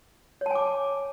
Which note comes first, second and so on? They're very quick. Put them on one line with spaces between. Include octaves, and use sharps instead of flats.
C#5 A5 G#5 D6